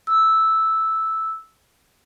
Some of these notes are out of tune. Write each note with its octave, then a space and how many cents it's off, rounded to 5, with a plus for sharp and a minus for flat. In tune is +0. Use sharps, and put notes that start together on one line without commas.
E6 -5